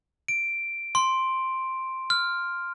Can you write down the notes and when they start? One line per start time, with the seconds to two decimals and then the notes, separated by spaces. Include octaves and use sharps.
0.28 D7
0.95 C6
2.10 F6